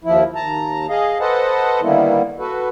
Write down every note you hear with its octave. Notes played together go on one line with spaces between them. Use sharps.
D#2 F3 E4
D#2 A5 A#5
G#4 D#5 F5
A4 B4 C5 D#5 F#5 A5
D3 D#3 G3 A#3 B3 E4
F#4 A4 B4